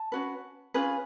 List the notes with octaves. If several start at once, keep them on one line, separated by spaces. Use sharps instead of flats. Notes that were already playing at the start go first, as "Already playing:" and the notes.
Already playing: A5
C#4 F#4 B4
C#4 F4 G#4 B4